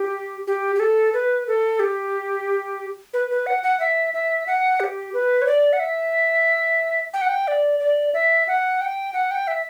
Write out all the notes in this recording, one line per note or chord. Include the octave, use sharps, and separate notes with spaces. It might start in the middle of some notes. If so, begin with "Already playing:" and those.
Already playing: G4
G4
G4
A4
B4
A4
G4
B4
B4
F#5
F#5
E5
E5
F#5
G4
B4
C#5
D5
F#5
E5
G5
F#5
G5
D5
D5
E5
F#5
G5
F#5
G5
E5